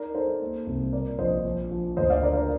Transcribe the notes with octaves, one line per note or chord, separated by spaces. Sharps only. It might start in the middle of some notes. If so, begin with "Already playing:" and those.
Already playing: D#4 A#4 D5
D#4 A4 C5
A#3
C2
A#2 A#4 D5
A#1 C5 D#5
F3
F3
D2 C5 D#5
D5 F5
D3 A#4 D5
A#4 D5